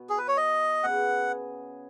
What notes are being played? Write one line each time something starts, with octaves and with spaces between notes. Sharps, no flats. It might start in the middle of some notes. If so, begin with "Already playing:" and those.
Already playing: B2 B3
G#4
B4
C#5
D#5
C#3 B3 G#4 F#5